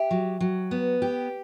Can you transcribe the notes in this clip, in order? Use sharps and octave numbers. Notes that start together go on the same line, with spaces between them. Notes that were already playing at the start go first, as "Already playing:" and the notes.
Already playing: G4 E5
F#3
F#3
B3
G4